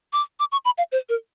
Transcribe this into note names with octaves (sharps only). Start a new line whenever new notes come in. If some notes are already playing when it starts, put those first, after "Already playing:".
D6
D6
C#6
B5
F5
C5
A#4